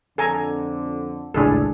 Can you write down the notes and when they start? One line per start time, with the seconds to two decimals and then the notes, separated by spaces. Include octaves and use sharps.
0.18 F2 D3 A4 G#5 A#5
1.34 G#1 C#2 A2 D4 G#4 A4